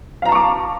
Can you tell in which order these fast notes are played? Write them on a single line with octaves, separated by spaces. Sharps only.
F5 A#5 A5 C#6 D6